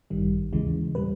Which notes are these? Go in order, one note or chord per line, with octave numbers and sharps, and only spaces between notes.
A1 G2 D#3 G3
D#2 C#3 E3 G#3
A#2 G3 B4